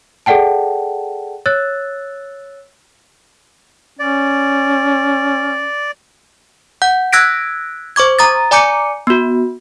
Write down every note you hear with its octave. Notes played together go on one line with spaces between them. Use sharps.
G#4 A4 D5 F#5 G5 A5
C#5 E6 F#6 A6
C#4 D5
F#5 G6
E6 F#6 G#6 A#6 B6 D7
C5 C#6 D6 G#6
A#5 D#6 A6
D5 G#5 A#5 D6 G6 C#7
B3 F#4